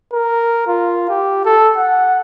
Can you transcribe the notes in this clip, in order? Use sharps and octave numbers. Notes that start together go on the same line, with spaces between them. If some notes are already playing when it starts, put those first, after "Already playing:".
A#4
F4
G4
A4
F#5